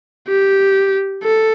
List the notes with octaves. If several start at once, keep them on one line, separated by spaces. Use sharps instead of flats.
G4
A4